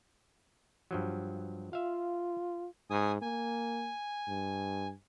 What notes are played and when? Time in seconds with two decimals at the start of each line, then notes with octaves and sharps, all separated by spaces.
0.91 G2 F3 F#3
1.73 F4 E5 F5
2.90 G#2 G#5 D#6
3.22 A#3 G#5
4.28 G2